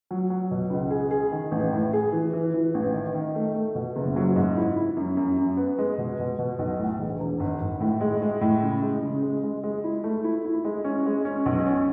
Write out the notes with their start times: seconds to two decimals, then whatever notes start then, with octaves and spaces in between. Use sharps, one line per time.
0.11 F#3
0.30 F#3
0.51 B2
0.70 C#2
0.90 G#4
1.11 G#4
1.32 D#3
1.51 A1
1.73 A2
1.93 G#4
2.13 E3
2.33 E3
2.54 E3
2.74 A1
2.94 D#3
3.14 D#3
3.35 A3
3.55 A3
3.75 B2
3.96 F#1
4.16 F#3
4.36 G#2
4.57 E4
4.76 E4
4.97 F#2
5.17 F#2
5.37 F#2
5.57 B3
5.78 G#3
5.98 B2
6.19 B2
6.39 B2
6.59 B1
6.79 A2
6.99 E1
7.20 E1
7.40 G#1
7.61 G#1
7.81 A2
8.01 G#3
8.22 G#3
8.41 A2
8.63 C#3
8.82 G#3
9.03 C#3
9.22 G#3
9.44 G#3
9.64 G#3
9.84 E4
10.04 A3
10.24 E4
10.45 E4
10.65 G#3
10.84 C#4
11.06 G#3
11.25 C#4
11.46 B1
11.66 C#4